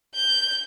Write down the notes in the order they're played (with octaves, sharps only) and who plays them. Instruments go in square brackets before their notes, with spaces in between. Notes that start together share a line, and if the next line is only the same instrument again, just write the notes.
[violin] G6